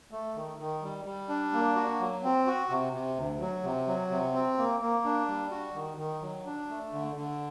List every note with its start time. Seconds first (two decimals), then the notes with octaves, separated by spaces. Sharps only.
0.11 A3
0.36 D#3
0.59 D#3
0.82 G3
1.05 G3
1.29 D4
1.53 A#3
1.76 F#4
1.99 F#3
2.23 C4
2.47 F#4
2.70 C3
2.93 C3
3.17 D2
3.40 F#3
3.64 C3
3.87 F#3
4.10 C3
4.33 C4
4.58 A#3
4.81 A#3
5.05 D4
5.28 G3
5.51 F#4
5.74 D#3
5.98 D#3
6.21 F#3
6.45 D4
6.69 A3
6.92 D3
7.16 D3